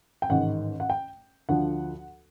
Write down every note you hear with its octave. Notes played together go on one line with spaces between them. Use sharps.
G5
A1 G#2 D#3 F#5
F#5
G5
D2 D3 F3 F#5